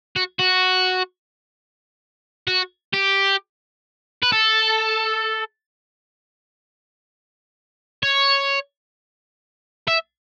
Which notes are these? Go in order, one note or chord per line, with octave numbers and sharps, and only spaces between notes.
F#4
F#4
F#4
G4
B4
A4
C#5
E5